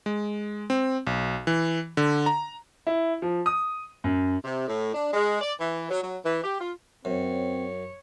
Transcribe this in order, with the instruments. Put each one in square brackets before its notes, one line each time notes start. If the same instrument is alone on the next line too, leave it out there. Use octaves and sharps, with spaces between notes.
[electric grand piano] G#3
C4
B1
E3
D3
A#5
[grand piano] E4
F3
D#6
F#2
[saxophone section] C3
A2
D4
G#3
D5
E3
F#3
F#3
E3
G4
F4
[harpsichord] F#2 [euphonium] C4 [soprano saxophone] C#5